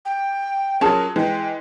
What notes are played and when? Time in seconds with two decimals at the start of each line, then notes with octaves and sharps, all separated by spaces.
0.05 G5
0.81 F#3 C#4 F4 G#4 A#4 A5
1.16 E3 G#3 G5